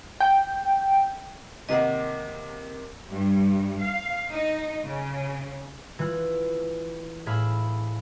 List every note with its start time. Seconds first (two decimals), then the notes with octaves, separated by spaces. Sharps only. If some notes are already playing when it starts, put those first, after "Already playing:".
0.20 G5
1.69 C3 D#3 A#3 D#5 F#5
3.11 G2
3.80 F5
4.31 D#4
4.85 C#3
5.99 E3 F4 F#6
7.26 A2 G#4 E5 F5 B5 F6